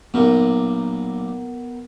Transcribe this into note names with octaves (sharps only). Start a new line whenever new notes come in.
B1 A#2 B3 A#4